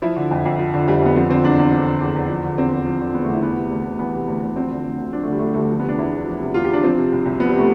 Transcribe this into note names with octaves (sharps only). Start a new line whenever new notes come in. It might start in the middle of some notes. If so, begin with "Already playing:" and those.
F3 E4
D3
F2
F2
F3
D3
F2 G3
F2 B3
F3 C4
D3 C4
E2 D4
E2
F3
D3
E2
E2
F3
D3
E2 C4
E2
F3
D3
E2 B3
A3
E2
E4
E3 B3
C3
D2
D2
E3 B3
C3
D2
D2
F3 C4
D3
D2
D2
F3 D4
A3
D3
G3
A3
D2
G3
D2 A3
G3
F3
B3
C3
D4
E2 E4
E2
F3
C3
E2 F4
G4
E2 D4
F3 C4
C3
C2
C2
F3 B3
G3
C3 A3